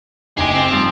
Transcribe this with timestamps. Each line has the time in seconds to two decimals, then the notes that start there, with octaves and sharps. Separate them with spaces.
0.38 F#1 G4 G#4 D#5 G#5 D7
0.54 C4 G#5 A6
0.71 G#2 F3 G3